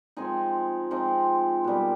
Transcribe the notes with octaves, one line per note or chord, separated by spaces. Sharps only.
F3 G#3 C4 D#4 G#5
F3 G#3 C4 D#4
B2 G3 A#3